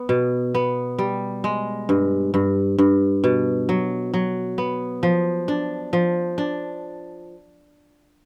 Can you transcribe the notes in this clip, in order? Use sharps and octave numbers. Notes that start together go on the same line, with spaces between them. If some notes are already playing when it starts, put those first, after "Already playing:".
Already playing: B3
B2
B3
G3
G#3
G2
G2
G2
B2
F#3
F#3
B3
F3
D4
F3
D4